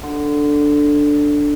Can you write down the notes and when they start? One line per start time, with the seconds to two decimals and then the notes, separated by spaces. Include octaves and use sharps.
0.03 D3